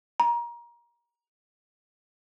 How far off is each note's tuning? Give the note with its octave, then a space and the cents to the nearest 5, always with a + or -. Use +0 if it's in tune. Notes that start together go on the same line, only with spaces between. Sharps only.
A#5 +25